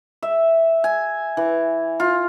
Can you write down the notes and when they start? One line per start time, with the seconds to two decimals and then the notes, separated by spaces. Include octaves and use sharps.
0.22 E5
0.84 G#5
1.37 E3
2.00 F4